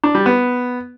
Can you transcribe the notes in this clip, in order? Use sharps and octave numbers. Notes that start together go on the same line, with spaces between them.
D4
G3
B3